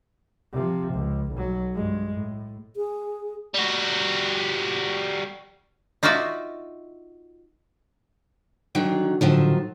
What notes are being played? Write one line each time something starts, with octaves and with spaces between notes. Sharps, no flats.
C3 F3
C#2
B1 F#3
G2 G#3
A2
G#4
G3 F#4
D#4 F4 F#4 D5 E5
D3 D#3 F#3
A2 D3 D#3 F3 F#3